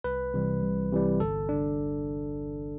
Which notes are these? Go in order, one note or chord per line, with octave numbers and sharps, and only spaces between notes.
C2 B4
C3 E3 G3
C2
C3 E3 G3
G1 A4
D3 D4